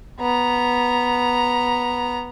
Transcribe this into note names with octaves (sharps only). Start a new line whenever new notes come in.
B3 A#5